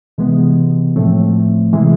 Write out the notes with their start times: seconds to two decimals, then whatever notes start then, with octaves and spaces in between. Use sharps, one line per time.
0.18 C#2 C3 E3 G#3 B3
0.96 A2 F3 A3 C4
1.73 C3 E3 G#3